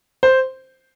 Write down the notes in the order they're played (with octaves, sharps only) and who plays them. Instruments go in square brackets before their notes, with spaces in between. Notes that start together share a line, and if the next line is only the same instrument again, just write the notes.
[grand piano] C5